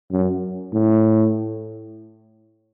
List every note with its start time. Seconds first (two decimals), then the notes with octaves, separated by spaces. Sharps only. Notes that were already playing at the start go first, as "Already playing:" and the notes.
0.11 F#2
0.73 A2